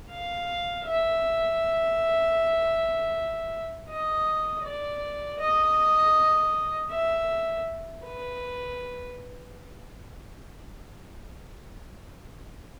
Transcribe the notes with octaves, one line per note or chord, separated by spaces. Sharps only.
F5
E5
D#5
D5
D#5
E5
B4